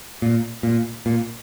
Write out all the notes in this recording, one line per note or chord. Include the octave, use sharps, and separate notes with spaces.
A#2
A#2
A#2